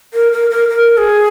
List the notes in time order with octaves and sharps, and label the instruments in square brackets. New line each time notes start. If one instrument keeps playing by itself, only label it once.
[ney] A#4
A#4
A#4
A#4
G#4